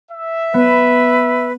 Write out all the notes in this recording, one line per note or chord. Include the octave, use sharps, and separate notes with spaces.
E5
B3 B4